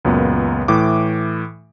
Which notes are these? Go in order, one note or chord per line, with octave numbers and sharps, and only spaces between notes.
C#2 F#2 A#2 B3
A2 E3 D6